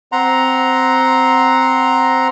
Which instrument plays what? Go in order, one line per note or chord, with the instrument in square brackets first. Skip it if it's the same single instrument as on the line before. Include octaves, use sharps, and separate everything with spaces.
[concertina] C4 F#5 A#5 C6